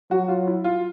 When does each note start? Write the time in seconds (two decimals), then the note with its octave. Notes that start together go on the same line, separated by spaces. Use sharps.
0.11 F#3 F#4
0.28 F4
0.47 E4
0.64 F4